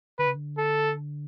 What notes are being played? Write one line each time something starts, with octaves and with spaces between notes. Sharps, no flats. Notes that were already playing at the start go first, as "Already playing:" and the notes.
D3 B4
C#3
D3
A4